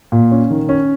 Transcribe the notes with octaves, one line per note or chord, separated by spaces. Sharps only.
A#2
C#4
D#3
C#4